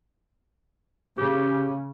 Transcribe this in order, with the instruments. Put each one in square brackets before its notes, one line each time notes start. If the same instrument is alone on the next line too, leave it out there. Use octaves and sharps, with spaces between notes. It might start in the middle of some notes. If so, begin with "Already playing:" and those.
[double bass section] C#3 [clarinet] G4